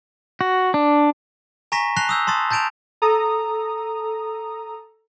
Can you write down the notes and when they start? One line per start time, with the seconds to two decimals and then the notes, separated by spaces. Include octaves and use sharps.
0.41 F#4
0.74 D4
1.72 G#5 A#5 C#6 A#6 B6 E7
1.96 A5 F#6 A#6 C7 F7 G7
2.09 D#6 E6 G6
2.27 A5 C6 D#6 A6
2.51 A5 G6 A6 D7 E7 F7
3.02 A4 A#5 D#6